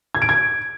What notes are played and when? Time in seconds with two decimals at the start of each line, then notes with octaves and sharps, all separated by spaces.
0.15 G#6
0.22 D7
0.29 G#6